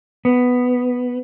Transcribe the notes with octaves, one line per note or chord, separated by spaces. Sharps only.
B3